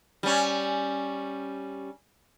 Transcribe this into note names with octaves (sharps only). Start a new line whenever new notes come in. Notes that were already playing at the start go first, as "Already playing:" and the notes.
G3 C#4